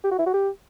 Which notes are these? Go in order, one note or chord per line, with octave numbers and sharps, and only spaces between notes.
G4
F#4
E4
F#4
G4